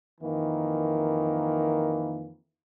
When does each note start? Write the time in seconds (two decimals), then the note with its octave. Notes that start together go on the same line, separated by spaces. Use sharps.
0.21 F2 D#3 E3 A#3